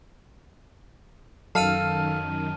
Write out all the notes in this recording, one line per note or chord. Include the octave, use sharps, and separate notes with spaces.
F#2 D#3 F#3 A4 F5 A5 F6 D#7